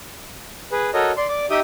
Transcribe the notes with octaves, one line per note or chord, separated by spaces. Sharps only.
G#4 B4
F#4 A4 A#4 C#5 D#5
D5 C6
D5 D6
D#4 G4 E5 G5 D#6